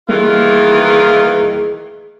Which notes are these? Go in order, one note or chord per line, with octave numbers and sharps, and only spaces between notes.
D#3 E3 G3 A3 A#3 F4 G#4